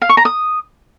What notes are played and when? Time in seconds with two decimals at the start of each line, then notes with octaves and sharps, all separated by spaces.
0.02 F5
0.09 C#6
0.17 A#5
0.25 D#6